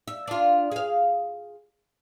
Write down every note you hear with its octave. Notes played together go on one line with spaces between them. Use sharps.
E5
D4 F4
G#4 F5